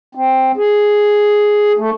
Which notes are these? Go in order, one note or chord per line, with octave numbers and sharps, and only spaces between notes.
C4
G#4
A3